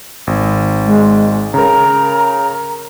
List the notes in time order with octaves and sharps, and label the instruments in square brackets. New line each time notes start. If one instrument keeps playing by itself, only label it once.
[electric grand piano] G#1
[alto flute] G#3
[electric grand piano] C#3 A#4 [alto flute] A#5